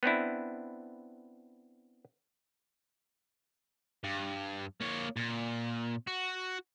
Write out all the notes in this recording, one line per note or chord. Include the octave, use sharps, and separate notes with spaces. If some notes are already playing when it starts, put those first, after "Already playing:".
B3 C4 D4 E4
G2
A#3 C#5
A#2
F#4